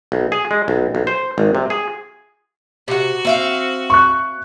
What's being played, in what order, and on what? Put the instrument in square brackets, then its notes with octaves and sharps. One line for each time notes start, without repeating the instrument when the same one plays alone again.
[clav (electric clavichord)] B1
G#4
G#3
B1
B1
C5
G#1
C3
G#4
[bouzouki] C3 F#5 [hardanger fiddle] F#4
[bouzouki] C4 E5 F5
[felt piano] C#6 F#6